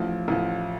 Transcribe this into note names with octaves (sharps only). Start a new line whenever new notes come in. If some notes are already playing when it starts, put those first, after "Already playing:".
Already playing: A1 A2 F3
A1 A2 F3